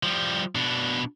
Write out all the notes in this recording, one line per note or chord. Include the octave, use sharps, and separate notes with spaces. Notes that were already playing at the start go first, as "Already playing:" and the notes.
F3 G3
B2 D4